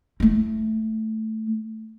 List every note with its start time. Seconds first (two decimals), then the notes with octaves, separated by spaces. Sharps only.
0.20 A3 E4